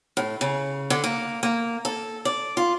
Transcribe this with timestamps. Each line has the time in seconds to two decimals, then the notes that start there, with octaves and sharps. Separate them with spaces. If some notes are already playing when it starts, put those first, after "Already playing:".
0.17 A2
0.41 C#3
0.90 D3
1.04 A#3
1.43 A#3
1.85 A4
2.25 D5
2.57 F4